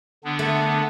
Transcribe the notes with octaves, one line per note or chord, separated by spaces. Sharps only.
D3 B3 D4
A3